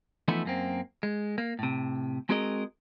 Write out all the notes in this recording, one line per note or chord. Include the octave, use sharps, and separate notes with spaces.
E3 F3 A3 B3 D#4 E4
F#2 A#3 C4
G#3
A#3
A2 C3
G#3 C4 F#4 G#4 A#4 D#5